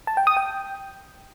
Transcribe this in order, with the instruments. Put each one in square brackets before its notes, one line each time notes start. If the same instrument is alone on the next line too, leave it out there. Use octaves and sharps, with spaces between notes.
[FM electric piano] A5
G5
D#6
G5